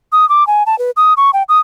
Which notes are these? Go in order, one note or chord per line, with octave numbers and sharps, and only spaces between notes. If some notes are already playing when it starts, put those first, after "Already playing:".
D#6
D6
G#5
A5
B4
D#6
C#6
G5
D#6